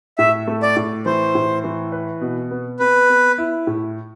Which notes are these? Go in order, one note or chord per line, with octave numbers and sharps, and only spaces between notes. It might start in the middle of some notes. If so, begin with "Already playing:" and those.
A2 E5
A3
D5
A2
E3 C5
A2
E3
B4
B2
B3
B3 B4
B3
E4
A2